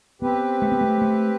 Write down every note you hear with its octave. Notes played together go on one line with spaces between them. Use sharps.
B3 C4 G4 B4
A3
B3
A3
A3